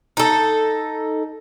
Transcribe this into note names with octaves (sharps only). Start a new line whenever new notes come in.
D#4 A4